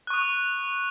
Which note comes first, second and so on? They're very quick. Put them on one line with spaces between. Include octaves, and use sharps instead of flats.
F#6 C#6 D#6